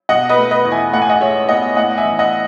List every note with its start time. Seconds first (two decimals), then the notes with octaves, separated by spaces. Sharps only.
0.09 B2 D#5 F#5
0.29 B4 D#5
0.37 A3
0.51 B4 D#5
0.65 E2
0.72 E5 G#5
0.93 A2 F#5
1.02 G#5
1.10 D#5 F#5
1.21 G#3 C#5 E5
1.49 B3 D#5 F#5
1.76 A2 D#5 F#5
1.97 E5 G#5
2.04 E3
2.19 D#5 F#5